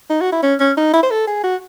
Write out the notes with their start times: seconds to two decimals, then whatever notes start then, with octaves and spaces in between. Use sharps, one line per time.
0.10 D#4
0.21 F#4
0.32 E4
0.43 C#4
0.60 C#4
0.77 D#4
0.93 E4
1.03 C5
1.11 A4
1.27 G#4
1.44 F#4